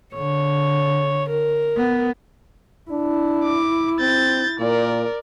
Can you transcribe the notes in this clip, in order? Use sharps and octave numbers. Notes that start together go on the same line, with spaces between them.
D3 C#5
A#4
B3
D4 E4
D6
C4 G6 A6
A#2 A#4 D5